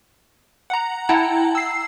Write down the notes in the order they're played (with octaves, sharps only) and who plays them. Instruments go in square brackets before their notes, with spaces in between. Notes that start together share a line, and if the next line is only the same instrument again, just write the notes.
[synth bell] F#5 A#5
E4 F#5 G5 A5 A#5
E6 C7